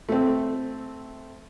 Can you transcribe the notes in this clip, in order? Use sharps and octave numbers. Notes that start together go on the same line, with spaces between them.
A3 C4